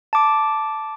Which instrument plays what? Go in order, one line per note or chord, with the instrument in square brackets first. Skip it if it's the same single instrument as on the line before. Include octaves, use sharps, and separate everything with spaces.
[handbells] A5 D6